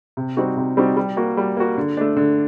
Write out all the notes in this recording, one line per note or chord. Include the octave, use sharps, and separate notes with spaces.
C3
G3 C4 D#4 F#4
C3
G3 C4 D#4 F#4
G3
A#3 F#4
G3
A#3 F#4
D3
A3 D4
D3